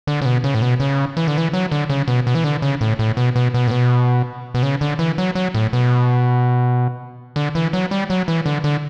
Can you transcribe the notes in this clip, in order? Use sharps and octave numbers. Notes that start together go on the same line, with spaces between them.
D3
C#3
B2
C#3
A2
B2
C#3
E3
D3
E3
F#3
D3
C#3
B2
B2
E3
D3
C#3
A2
A2
B2
B2
B2
A2
B2
B2
C#3
D3
E3
F#3
F#3
A2
B2
D3
E3
F#3
G3
F#3
E3
D3
D3